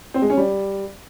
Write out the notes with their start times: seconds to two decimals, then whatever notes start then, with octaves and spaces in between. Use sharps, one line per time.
0.14 C4
0.22 G#3
0.30 C#4
0.37 G3